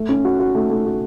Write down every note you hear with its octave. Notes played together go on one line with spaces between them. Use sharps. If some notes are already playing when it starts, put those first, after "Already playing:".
Already playing: A3
C#4
F#4
F#4
A3
A3
F#4